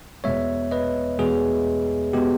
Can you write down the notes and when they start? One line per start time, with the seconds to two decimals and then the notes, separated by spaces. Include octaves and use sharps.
0.24 E2 B2 G#3 B3 C#5 E5
0.71 B4 D#5
1.19 E2 B2 G#3 B3 G#4
2.13 B2 G#3 B3 G4